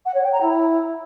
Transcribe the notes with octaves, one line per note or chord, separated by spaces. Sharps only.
F#5
C#5
G5
A#5
E4